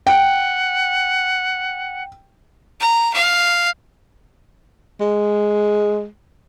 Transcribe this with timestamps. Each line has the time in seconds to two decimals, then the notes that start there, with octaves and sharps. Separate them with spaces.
0.07 F#5 G5
2.80 A#5
3.14 F5
5.01 G#3